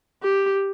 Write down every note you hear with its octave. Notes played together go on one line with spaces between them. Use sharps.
G4